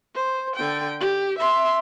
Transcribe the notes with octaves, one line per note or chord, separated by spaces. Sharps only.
C5
D3 G5
G4
E5 C6